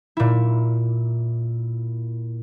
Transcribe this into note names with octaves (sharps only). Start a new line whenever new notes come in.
A#2 E4